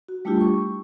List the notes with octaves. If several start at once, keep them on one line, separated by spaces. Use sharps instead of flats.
F#4
G3 A3 D4 E4 F4 G4
C#6